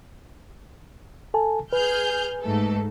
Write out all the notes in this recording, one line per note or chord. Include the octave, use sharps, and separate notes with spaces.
A4 G#5 A5
G#4 B4 F6 G6
G#2 A3 A4